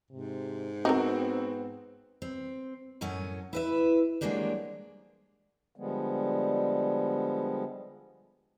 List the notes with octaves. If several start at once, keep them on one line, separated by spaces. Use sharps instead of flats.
G#2 C3
B3 C4 D#4 F#4 A#4
C4
F#2 A2 F#3 C#4 C#5
E4 B4 E5
F3 F#3 G#3 A#3 D4 G4
D3 F3 G3 G#3 B3